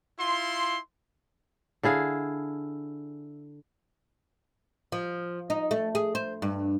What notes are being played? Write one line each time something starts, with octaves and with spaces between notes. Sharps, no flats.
E4 F4 C6
D3 E4 G#4 F5
F3
D#4
A3
G#4
C5
G2